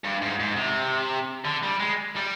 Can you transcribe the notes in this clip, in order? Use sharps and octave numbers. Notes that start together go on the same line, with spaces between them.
G2
G#2
G#2
C3
D3
G3
G#3
G3